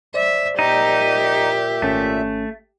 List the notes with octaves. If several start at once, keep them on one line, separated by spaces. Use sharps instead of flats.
C5 D5 E5
A#2 D#4 G4 E5
G#1 A3 C#4